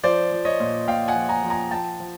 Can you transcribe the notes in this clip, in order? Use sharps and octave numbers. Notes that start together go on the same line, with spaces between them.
F3 C5 D5
F3
C#5 D#5
A#2
A#2 F5 G5
F#5 G#5
F3
G#5 A#5
F3
G#5 A#5
F3 G5 A5
F3